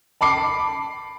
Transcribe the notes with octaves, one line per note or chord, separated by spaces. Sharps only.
A5 B5 D6 C7